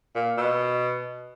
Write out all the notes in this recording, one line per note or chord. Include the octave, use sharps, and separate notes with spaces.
A#2
B2